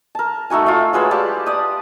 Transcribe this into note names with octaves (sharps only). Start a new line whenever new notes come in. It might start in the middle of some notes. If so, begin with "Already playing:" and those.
A#4 A5
A3 D#4 F#4 G#5
F4 E5
F#3 G#3 B4 E6
F4 G4 D5 A5
D5 D#6